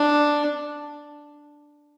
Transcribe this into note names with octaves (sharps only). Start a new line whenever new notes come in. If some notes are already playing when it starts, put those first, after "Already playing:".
Already playing: D4